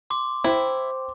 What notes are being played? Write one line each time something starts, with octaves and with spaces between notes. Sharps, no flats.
C6 D6
E4 C5 G5